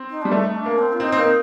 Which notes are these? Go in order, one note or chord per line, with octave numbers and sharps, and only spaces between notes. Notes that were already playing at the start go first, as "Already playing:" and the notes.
Already playing: C4
D#4
G3 D4
A3 D#4
D4
A#3
C4
F4
C4 D#4
C4
A#3